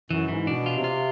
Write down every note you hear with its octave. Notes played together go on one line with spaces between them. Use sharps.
F#2 E3
G#2 E3
B2 D4
F4
C3
F4